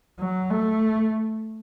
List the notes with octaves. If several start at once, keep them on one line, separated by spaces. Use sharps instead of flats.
F#3
A3